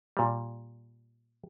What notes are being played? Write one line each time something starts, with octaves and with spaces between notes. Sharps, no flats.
A#2 G3